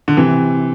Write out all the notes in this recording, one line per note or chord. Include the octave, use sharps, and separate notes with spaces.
D3
C3 E3